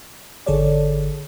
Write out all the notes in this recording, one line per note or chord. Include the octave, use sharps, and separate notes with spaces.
G#1 D3 G#4 A4 C#5 D5